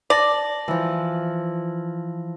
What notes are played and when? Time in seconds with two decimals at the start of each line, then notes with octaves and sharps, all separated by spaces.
0.10 D5 A5 A#6 F#7
0.68 E3 F3